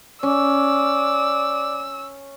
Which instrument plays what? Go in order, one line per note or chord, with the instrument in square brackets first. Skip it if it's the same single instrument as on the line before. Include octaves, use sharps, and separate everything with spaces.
[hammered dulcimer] C#4 [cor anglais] D5 [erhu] E6